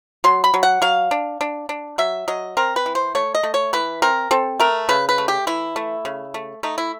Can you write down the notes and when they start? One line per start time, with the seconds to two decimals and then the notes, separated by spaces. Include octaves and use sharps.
0.24 F#3 C6
0.44 B5
0.54 F#3
0.63 F#5
0.82 F#3 F5
1.11 D4
1.41 D4
1.69 D4
1.98 F#3 E5
2.28 F#3 D#5
2.57 C4 A#4
2.76 B4
2.86 E3
2.95 C5
3.15 A3 C#5
3.35 D#5
3.43 A3
3.54 C#5
3.73 E3 B4
4.02 C4 A#4
4.31 C4 A4
4.60 A3 A#4
4.89 C#3 B4
5.09 B4
5.18 A3
5.28 G4
5.47 E3 E4
5.76 A3
6.05 C#3
6.34 A3
6.63 A3 D#4
6.78 E4